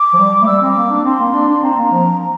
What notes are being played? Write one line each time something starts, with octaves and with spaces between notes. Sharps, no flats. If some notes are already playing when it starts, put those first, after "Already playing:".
Already playing: D6
F3
G3
A3
G3 E6
C4 D6
A#3
D4
C4 C6
A#3
D4
D4
C4 A#5
A#3
F3
A#5